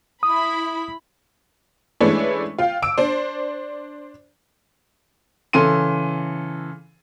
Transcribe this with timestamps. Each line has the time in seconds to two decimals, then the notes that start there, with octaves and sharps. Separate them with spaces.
0.23 E4 B5 D#6
2.00 E3 G#3 A3 C#4 D4 E4
2.58 F4 F5 G5
2.82 D6 E6 D7
2.98 D4 C5
5.53 C#3 E3 A4 C6 D#7